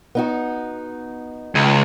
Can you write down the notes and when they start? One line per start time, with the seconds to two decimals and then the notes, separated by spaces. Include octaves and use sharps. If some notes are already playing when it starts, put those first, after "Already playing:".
0.15 B3 D#4 F#4
1.55 C#2